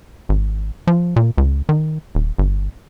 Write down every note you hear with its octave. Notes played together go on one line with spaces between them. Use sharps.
G#1
F3
A#2
C#2
D#3
D#1
G1